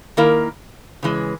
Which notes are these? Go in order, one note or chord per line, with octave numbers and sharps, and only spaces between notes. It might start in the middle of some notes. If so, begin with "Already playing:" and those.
D#3 A#3 E4 A#4
C#3 E3 G#3